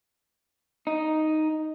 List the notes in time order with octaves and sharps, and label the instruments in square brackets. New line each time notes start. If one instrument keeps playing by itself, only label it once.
[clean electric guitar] D#4